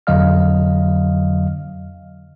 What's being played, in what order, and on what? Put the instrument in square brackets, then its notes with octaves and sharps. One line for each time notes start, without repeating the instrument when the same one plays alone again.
[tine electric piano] F2 D3 F#3 D#5 F5 F6